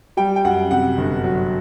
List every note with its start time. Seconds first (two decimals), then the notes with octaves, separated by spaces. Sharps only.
0.17 G3 G5
0.36 G5
0.44 F#2 F#5
0.71 C3 F#5
0.97 G1
1.24 F#3